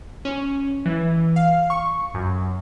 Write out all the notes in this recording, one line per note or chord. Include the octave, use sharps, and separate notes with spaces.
C#4
E3
F5
C#6
F#2